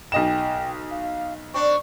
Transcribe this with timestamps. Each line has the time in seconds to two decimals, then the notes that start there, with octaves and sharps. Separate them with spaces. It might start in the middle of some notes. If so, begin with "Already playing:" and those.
0.12 B1 D#5 G5 E7
0.91 F5
1.54 C4 D4 C#6